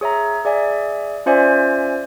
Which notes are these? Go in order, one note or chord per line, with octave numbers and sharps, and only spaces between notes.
G#4 C#5 E5 A#5
G#4 D5 E5 G#5
C#4 F4 C5 D5 E5 G#5